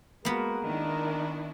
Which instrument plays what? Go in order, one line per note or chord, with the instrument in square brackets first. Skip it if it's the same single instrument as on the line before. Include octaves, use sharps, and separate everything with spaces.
[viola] G#3 F#4 [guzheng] A#3 B3 [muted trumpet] A#4
[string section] D#3 E4 [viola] D4